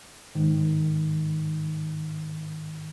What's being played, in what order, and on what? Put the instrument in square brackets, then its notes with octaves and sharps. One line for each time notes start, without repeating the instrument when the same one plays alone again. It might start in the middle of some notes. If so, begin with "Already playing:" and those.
[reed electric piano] G#2 D#3